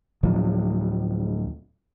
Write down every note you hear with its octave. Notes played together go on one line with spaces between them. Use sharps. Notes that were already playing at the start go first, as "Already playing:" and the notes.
D2 A2 F3 F#3